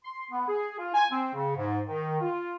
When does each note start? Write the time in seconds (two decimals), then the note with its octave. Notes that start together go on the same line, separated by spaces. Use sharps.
0.04 C6
0.31 B3
0.47 G#4
0.78 F4
0.94 G#5
1.11 C4
1.34 C#3
1.56 G#2
1.88 D#3
2.21 F4